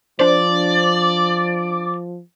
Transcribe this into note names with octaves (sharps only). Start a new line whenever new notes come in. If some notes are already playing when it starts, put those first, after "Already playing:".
F3 D4 C5 D5